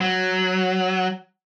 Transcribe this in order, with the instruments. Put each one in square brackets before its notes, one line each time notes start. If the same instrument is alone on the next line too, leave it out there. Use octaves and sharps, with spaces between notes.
[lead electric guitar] F#3